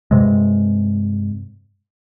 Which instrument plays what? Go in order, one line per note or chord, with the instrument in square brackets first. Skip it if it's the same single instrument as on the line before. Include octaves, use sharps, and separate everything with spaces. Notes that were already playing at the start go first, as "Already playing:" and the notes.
[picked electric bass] G2 C3 G#3